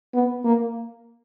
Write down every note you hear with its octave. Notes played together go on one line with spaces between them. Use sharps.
B3
A#3